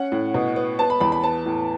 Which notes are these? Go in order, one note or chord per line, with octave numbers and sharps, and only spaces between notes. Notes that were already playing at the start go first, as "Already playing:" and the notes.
Already playing: C#4 F#5
A2
B2
B3
B3 A5
B5
E2 B5
B5
B3 A5
A2